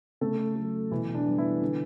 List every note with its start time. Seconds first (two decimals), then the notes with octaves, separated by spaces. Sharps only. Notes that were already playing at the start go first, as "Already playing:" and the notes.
0.21 C#3 A3 A4
0.56 F#3 A3
0.91 B2 E3 E4
1.15 D4
1.26 G3 B3
1.38 E3 E4
1.62 D3